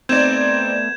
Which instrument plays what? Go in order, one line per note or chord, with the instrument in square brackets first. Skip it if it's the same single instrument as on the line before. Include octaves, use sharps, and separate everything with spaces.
[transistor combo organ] A3 B3 [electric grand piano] C4 D#4 D5 [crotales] G6 G#6 E7